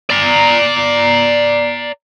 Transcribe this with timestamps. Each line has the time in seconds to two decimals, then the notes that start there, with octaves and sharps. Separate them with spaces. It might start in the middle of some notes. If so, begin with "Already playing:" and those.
0.10 D5 A#5